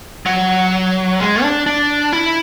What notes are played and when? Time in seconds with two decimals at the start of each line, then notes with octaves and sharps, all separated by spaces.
0.26 F#3
1.20 G#3
1.43 D4
1.66 D4
2.13 E4